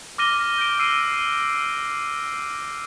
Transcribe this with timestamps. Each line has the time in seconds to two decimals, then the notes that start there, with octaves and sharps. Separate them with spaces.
0.18 D6 F6 A#6 D#7 G7
0.58 G6 D7
0.79 E6 C7 D#7 G7